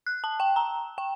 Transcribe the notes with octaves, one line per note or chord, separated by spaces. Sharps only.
F#6
A5
G5
A#5
G5